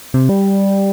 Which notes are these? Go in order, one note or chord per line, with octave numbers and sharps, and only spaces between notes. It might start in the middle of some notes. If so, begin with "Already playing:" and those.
C3
G3